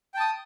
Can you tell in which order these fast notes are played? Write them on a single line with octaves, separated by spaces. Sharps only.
G5 A5 D#6